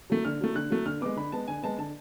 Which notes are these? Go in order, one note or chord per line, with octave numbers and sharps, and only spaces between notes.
F#3 A3
D3 F6
F#3 A3
D3 F#6
F#3 A3
D3 F6
G#3 B3 D6
D3 B5
G#3 B3 A5
D3 G#5
G#3 B3 A5
D3 A5